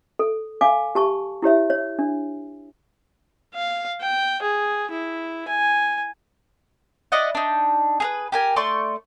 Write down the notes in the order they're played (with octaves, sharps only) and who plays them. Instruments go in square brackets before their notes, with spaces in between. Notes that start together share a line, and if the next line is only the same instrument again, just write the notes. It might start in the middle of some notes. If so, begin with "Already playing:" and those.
[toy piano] A4
F5 G#5 D6
G4 A5 C#6
E4 G4 C#5 E5
C#5
D4
[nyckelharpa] F5
G5
G#4
E4
G#5
[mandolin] E4 D5 D#5 F#5
D4 D#4
G#4 A#4 B4
G4 A#4 G#5
A3 D5 C6 C#6